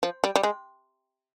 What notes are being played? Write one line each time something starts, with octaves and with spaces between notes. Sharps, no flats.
F3
G3
G3
G#3